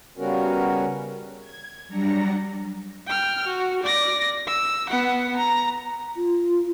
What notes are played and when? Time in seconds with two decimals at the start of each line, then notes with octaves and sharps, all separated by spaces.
0.17 C#3 G3 B3 C#4 F#4 A#4
1.40 G#6
1.88 F#3 G3 D4 A#5 A#6 C#7
3.07 G5 F6
3.47 F#4
3.83 D5 A#6
4.47 E6
4.89 B3 F#5
5.37 A#5
6.16 F4